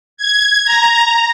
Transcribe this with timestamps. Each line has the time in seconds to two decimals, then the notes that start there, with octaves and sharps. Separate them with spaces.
0.17 G#6
0.65 A#5